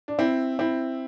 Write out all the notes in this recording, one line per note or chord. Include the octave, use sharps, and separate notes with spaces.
D4
C4 E4
C4 E4